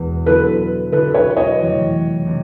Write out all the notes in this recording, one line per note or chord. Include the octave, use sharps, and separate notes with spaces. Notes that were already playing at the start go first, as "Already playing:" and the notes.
Already playing: E2 B2 G#3 B3 E4
D3 F#3 B3 E4 A4 B4
D3 F#3 B3 E4 A4 B4
B4 C#5
C#5 D#5
F2 C3 E3 A3 C4
C3 E3 A3 C4